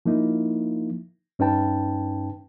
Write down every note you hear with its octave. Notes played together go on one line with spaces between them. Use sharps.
F3 A#3 D#4 E4
G2 C#4 D#4 B4 G5 A5